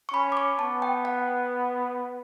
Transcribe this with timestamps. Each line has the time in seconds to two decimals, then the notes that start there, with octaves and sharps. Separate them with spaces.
0.09 C#6
0.14 C#4 B5
0.32 D6
0.37 C#6
0.59 B3 A5
0.82 G5
1.05 F#5